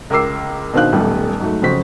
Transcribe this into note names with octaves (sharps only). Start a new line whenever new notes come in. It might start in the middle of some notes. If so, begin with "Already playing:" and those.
C#2 A#4 D6 E6 C7
B2 D#3 C4 D4 F5 F#6
D#1 B1 G3 A3
G#2 F#3 A3
F2 C#3 F#3 C4 F#4 B6